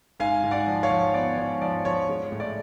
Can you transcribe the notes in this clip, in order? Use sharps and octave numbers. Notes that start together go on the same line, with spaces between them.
G#2 F5 G#5
G#2
D5 F#5
F3
C#5 F5
F3
B3 D5
G#2 C#5
F3 D5
F3 C#5
G#3
A2
D5